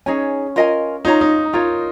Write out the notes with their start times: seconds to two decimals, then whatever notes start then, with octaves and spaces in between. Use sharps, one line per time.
0.06 C#4 D#4 G#4 C#5 G#5
0.56 F4 A#4 D#5 G#5
1.05 D#4 F4 C#5 A#5
1.21 D#4
1.53 D#4 F4 A#4 C#5 A#5